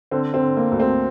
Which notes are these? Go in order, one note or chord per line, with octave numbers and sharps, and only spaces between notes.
D3 C4
C4
D3
A#3
D2
C4